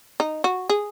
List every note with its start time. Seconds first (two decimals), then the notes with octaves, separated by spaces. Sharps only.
0.20 D#4
0.44 F#4
0.69 G#4